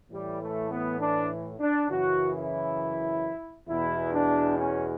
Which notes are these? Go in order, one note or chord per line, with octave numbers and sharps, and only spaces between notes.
A2 E3 G3
A3
B3
D4
D4
F#2 C#3 E3 F#4
E4
E2 B2 E4
D4
C#4